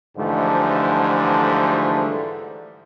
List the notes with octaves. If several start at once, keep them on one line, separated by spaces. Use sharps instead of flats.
G#2 D3 E3 F3 G3 A3